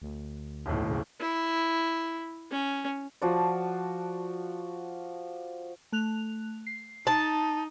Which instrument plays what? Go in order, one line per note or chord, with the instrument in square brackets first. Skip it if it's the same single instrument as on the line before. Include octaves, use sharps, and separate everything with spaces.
[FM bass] D2
[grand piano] D#1 B1 A2
[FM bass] C#3
[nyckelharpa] E4
C#4
[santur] F3 F#4 D5
[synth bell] A3 F#6 F7
C7
[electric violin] D#4 [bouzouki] A5